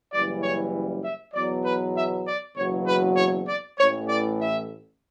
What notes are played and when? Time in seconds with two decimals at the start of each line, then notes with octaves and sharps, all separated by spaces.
0.13 F#1 F#2 E3 G3 D5
0.43 C#5
1.04 E5
1.34 E2 B2 F#3 D5
1.65 B4
1.96 E5
2.26 D5
2.55 F#1 E2 B2 F#3 C#5
2.86 B4
3.17 C#5
3.47 D5
3.77 A1 A2 E3 C#5
4.08 D5
4.39 E5